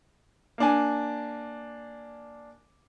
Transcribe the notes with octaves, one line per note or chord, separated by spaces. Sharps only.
A#3 D4 G#5